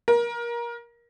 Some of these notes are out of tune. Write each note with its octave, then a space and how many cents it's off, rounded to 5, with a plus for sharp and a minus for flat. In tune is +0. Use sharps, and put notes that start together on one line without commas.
A#4 +25